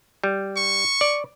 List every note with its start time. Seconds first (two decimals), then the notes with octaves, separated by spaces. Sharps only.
0.24 G3
0.57 C#6
1.01 D5